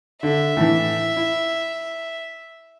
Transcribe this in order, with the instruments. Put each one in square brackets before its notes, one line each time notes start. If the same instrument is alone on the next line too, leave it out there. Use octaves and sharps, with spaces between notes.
[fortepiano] D3 [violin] E5
[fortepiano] A2 E3
E4